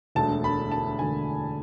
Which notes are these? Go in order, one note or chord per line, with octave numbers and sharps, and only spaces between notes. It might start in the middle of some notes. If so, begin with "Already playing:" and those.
E1 D2 D3 A3 A5
B5
A5
E1 D2 D3 A3 G#5